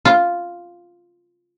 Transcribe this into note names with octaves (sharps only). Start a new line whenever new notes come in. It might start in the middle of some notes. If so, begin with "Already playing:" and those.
F4